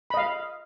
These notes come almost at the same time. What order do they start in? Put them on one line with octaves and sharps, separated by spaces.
B5 D#5 F5